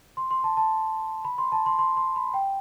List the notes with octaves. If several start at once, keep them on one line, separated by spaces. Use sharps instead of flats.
C6
C6
A5
A5
B5
C6
A5
C6
C6
C6
B5
G5